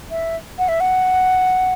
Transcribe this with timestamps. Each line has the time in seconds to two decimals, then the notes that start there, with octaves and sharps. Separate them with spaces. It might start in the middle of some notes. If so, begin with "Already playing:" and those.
0.11 E5
0.58 F#5
0.68 E5
0.80 F#5